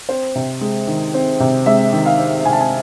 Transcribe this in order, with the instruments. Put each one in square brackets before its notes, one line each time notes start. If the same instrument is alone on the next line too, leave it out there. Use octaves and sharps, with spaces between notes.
[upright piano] C4 C5
C3
G#3
D#3
C4
C3
G#3 E5
D#3
F5
C4
C3 G#5
A5
G#5